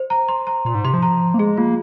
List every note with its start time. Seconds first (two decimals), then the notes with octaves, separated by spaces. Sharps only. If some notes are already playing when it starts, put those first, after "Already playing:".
Already playing: C5
0.10 A#5
0.28 C6
0.47 A#5
0.65 A#2 C6
0.75 G#2
0.85 C3 C6
0.94 F3
1.02 A#5
1.34 A#3
1.39 G#3 G#4
1.57 A#3 F4